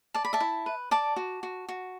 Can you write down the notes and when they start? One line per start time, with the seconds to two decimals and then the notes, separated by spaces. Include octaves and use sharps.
0.14 D5 A5
0.25 B5
0.33 E5 A5
0.40 E4
0.66 B4
0.91 D5 A5 D6
1.16 F#4
1.43 F#4
1.69 F#4